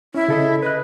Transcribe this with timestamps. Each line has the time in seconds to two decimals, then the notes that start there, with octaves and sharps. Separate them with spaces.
0.15 C#4 E4
0.28 C#3 A4 D#5
0.63 B4 D#5 F#6